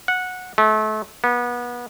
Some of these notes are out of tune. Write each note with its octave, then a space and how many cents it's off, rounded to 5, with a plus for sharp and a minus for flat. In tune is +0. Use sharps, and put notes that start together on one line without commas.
F#5 -15
A3 -35
B3 -30